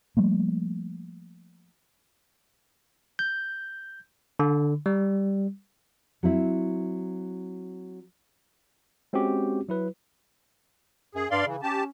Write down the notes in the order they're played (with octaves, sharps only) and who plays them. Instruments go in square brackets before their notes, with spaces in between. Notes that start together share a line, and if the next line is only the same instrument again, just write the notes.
[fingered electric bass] F3 G3 A3 A#3
[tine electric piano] G6
D3
G3
[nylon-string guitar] F#3 C4 E4
[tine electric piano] G#3 C4 C#4 F#4 G4
F#3 E4 B4
[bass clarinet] F#2 [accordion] G#4
[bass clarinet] G2 [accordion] D5 F5 C6
[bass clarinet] C#3 [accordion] E3
[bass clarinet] C#4 [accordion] G4 A5